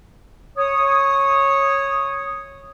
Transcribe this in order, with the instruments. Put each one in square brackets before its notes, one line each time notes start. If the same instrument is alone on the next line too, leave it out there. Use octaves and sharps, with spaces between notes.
[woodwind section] C#5 D#6